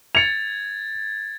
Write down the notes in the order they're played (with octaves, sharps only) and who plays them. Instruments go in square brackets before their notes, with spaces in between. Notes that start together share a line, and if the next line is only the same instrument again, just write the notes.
[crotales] G#6 A6 [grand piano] C#7 F7